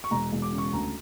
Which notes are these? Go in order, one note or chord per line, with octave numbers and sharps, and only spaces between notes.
C#6
E1 A#5
E1
D6
C#3
C#6
D2 A#5